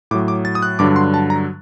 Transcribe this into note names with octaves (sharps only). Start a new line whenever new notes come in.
A2 F#3 D6
D6
A6
D#6
F#6
G2 D3 F#3 D6
C6
A5
A#5